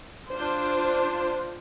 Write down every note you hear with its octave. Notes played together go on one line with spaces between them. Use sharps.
D4 F4 C5